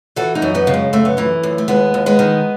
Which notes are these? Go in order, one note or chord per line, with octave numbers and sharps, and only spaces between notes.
E3 F#4 A4
D#4 F#4
F#2
B3 D#4
C#3
G#3
F#2 A3
B3
E3 A3
F#2
A3
D#2 G#3 B3
D#2
G#3 B3
D#3